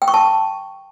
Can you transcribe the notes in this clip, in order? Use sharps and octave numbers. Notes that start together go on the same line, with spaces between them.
G5
C#6
A5